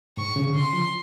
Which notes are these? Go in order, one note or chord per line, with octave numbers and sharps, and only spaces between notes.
G#2 C#6
C#3
D3
C#3 C6
F3